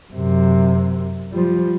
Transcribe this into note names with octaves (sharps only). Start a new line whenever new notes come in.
F#2 C3
F3 G3